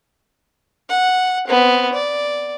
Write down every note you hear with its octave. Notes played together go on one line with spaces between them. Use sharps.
F#5
B3 C4
D5